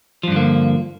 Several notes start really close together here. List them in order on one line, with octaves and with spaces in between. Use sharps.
F3 G2 D3 A#3